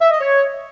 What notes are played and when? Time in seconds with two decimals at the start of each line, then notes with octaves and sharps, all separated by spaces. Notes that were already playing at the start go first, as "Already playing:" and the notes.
0.01 E5
0.11 D#5
0.21 C#5